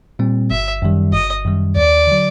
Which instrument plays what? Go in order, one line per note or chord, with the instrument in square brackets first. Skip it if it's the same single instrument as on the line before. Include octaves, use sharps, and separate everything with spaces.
[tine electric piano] A#2 G3 C4
[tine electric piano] G1 [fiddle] E5
[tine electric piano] F#2 D#3 G3
[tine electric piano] G1 [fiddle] D#5
[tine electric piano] F#2 D#3 G3
[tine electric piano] D#2 [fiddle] D5
[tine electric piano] D3 F#3